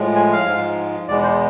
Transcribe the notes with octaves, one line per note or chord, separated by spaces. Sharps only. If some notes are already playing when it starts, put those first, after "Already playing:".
Already playing: A2 F3 G#3
G#5
F5
G#2 F3 G#3
E2 B2 G#3 B3 D5
C5